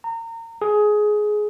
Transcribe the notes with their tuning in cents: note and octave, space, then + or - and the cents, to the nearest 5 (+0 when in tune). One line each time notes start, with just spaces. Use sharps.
A#5 -30
G#4 +15